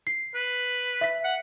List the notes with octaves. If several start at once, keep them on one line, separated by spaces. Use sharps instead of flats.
C7
B4
E5 B6
F#5